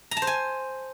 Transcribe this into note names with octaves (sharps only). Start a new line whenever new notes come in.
A#5
A5
C5
G#5